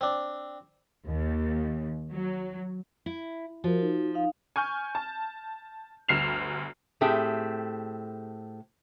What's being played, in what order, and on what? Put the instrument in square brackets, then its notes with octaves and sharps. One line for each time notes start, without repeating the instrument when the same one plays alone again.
[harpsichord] C4 D4
[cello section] D#2
F#3
[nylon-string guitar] E4
[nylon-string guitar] F3 [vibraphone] F#4 A#4
[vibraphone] D#4 F#4
D#4 F5
[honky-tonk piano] G#5 C#6 F6 G6
A5
G1 D2 F6 C7 E7 F7
[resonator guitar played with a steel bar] A2 A3 C4 G4 G#4 A5